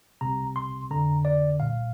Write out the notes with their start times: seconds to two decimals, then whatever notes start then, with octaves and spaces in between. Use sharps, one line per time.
0.21 C2 C3 A#5
0.56 C6
0.91 F2 D3 A#5
1.25 D5
1.60 C2 A#2 F5